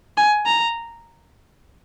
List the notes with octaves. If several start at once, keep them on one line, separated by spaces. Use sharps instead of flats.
G#5
A#5